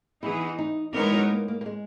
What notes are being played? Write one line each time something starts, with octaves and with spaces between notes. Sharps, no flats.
E3 B3 D#4 E4 G#4
D#4
E3 G#3 B3 D#4 A#4 C#5
F#3
A#3
A#3
A#3
G#3